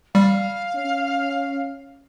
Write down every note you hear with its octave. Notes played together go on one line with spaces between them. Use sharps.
G3 F5
C#4